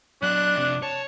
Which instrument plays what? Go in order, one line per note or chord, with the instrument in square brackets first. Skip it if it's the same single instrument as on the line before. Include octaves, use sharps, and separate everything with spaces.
[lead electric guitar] F#3 D#5 [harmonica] D4 [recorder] F#6
[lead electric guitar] F2 C3
[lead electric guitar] C#5 [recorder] A5